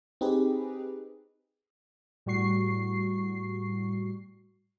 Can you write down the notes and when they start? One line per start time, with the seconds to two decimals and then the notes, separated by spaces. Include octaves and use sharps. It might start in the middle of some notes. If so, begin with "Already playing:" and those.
0.21 C4 D#4 G4 G#4 B4
2.26 A2 G3 F#4 C#6 C7